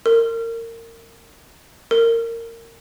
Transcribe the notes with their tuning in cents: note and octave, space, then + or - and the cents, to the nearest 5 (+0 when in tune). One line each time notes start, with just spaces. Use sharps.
A#4 -25
A#4 -20